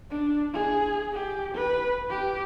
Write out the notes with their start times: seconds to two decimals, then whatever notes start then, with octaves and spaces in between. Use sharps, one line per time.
0.10 D4
0.53 G#4
1.13 G4
1.55 B4
2.10 G4